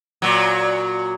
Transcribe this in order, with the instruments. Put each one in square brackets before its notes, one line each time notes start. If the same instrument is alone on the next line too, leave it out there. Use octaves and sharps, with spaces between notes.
[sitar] A#2 F#3